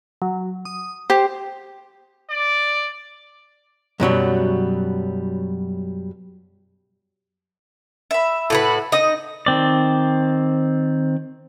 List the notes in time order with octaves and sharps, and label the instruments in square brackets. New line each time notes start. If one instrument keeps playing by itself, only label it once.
[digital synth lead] F#3
D#6
[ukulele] G4 [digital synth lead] C5
[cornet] D5
[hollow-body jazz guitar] F#2 B2 F#3 G3
[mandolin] E5 B5
[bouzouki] A2 F#4 B4
[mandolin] D#4 D#6 [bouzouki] D#5
[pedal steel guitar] D#3 C4 D5